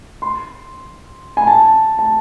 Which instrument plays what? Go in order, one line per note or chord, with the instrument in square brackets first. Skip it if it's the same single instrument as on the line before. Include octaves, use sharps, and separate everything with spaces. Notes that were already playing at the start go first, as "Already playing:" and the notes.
[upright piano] C6
G#5
A5
A5